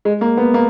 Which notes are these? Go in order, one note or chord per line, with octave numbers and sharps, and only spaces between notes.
G#3
A#3
B3
A#3